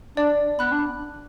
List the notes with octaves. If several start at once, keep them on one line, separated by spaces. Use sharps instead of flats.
D4 D5
B3 B5 F#6
D4